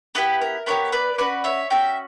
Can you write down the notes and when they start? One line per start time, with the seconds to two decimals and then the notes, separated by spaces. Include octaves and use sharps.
0.15 B3 E4 G4 B4
0.41 A#4
0.66 B3 E4 G4 A#4 C#5
0.92 B4 D5
1.18 C#4 F#4 B4 D5
1.44 C#5 E5
1.70 C#4 F#4 E5 G5